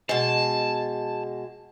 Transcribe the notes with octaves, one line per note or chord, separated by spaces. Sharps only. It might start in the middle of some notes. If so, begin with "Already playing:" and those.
B2 G#3 A5